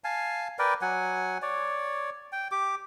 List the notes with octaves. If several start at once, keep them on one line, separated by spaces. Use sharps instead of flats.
F5 G#5 A5
A#4 B4 D5 G5
F#3 F#5 G#5
C#5 D5
G5
G4 D6